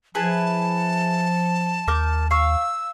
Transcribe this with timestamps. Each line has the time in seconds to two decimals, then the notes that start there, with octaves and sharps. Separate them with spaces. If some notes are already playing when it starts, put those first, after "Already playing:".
0.15 F3 E4 G#4 B4 A5
1.87 D#2 A#4 D6 G6
2.31 F5 C#6 E6